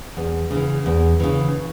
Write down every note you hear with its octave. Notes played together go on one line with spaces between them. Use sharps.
E2
C#3 E3
E2
C#3 E3